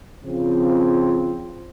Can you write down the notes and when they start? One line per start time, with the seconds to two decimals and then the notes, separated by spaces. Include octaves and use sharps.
0.25 C#3 F3 C4